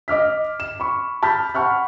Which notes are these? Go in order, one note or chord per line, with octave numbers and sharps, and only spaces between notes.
D#5 D6 F6 B6
E7
B5 C#6
A5 B5 F6 G6 B6
F#5 A5 B5 C#6 F6 F#6